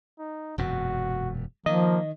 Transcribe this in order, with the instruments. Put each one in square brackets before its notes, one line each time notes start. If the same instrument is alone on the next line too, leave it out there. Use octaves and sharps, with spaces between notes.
[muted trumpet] D#4
[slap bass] E1 F#2 A#2 [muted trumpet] F#4
[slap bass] D#3 [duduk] F3 [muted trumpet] A#3 [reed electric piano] D#5